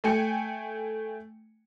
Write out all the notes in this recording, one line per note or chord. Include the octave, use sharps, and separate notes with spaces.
A3 G5 G#5 C#7